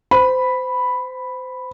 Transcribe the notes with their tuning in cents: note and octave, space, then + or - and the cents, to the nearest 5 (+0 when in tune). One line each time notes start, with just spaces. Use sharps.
C5 -25 B5 +0